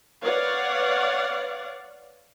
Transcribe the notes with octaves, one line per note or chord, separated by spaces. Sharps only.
B4 C#5 D5 F5 F#5